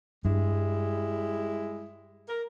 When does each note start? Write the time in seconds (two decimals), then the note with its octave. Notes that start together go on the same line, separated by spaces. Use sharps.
0.25 G2 G3 G#3 E4
2.29 A#4